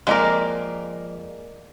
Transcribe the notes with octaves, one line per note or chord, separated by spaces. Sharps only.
F2 G#3 A#3 A#4 D5